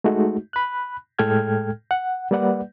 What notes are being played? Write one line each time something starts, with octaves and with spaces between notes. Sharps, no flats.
G#3 A3 D#4 F#4
B5 F#6
A2 G#3 A4 G5 F6 G#6
F#5
G3 A#3 B4 D5 F#5